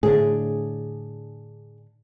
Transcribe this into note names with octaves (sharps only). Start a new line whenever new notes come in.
A2 D3 D4 G#4